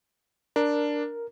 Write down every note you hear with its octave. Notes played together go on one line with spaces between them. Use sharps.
D4 A#4